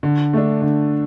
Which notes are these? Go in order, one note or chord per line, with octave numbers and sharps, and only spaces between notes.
D3
A3 D4
D3